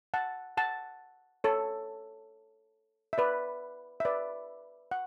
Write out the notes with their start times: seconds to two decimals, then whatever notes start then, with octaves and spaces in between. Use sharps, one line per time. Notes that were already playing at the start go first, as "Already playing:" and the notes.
0.14 F#5 A5
0.57 F#5 A5
1.44 A4 C#5
3.13 E5
3.18 B4 D5
4.00 E5
4.05 B4 D5
4.91 F#5